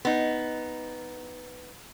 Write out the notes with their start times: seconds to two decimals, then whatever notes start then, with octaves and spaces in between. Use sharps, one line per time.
0.05 B3 D#4